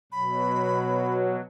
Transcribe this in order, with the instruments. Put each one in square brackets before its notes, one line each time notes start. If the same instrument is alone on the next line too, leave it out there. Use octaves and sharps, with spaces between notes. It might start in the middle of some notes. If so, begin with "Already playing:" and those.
[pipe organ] B2 F#3 [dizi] B5